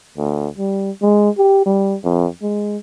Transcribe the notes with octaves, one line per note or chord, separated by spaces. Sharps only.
D2
G3
G#3
G4
G3
F2
G#3